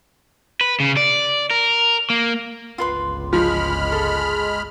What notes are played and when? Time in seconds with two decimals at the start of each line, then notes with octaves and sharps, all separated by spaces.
0.61 B4
0.80 C#3
0.97 D5
1.51 A#4
2.10 A#3
2.78 G1 C#2 F4 B4 C6
3.33 F3 G#3 B5 F6
3.92 A4